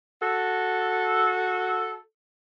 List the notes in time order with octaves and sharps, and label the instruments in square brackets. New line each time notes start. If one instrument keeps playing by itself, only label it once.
[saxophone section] F#4 A4